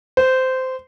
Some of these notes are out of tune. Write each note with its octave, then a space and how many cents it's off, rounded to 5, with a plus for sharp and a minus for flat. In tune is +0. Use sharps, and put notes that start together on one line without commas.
C5 -15